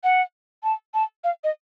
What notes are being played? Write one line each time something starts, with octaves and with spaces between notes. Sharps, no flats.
F#5
A5
A5
F5
D#5